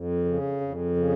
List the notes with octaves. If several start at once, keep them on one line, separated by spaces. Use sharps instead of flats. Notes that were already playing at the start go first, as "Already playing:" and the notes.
Already playing: F2
C#3
F2
C#3